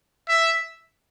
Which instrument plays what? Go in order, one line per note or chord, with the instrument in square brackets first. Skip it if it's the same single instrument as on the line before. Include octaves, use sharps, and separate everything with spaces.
[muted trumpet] E5